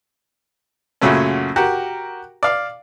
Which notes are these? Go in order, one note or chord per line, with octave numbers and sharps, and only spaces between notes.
F#2 A#2 C#3 F#3 A3 C#4
F#4 G4 A#4
D5 F5